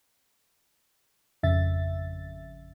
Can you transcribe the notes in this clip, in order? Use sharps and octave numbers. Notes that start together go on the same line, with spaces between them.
G#1 F2 C#3 E5 A6